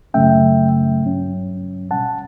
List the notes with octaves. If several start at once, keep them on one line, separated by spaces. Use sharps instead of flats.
F#2 C#3 F#3 A3 C#4 E5 G5
G2 F#3 C#4
B2 G3 C#4 F#5 A5